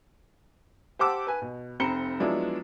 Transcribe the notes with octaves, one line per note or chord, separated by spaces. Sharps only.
G4 C5 F#5 A5 D6 E6
B4 G#5
B2
F1 C4 A#5 B5 C#7 G7
F3 F#3 G#3 B3 D4 E4